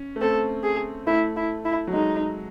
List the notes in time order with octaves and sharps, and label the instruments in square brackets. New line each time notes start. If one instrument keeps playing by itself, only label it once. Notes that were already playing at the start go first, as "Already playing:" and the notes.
Already playing: [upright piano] C#4
A3
[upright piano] C4 [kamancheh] A4
[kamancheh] G#4
[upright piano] A3 [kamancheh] E4
[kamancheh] E4
E4
[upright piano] F#3
[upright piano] G#3 [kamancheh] D#4